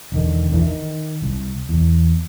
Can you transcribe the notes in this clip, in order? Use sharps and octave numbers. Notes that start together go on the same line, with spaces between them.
E1 D3 D#3
E2 D3 E3
D#3
C2
E2